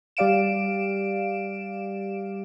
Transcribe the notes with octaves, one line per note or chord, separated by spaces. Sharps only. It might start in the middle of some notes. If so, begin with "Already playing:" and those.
G3 G4 D5 F5 D7 E7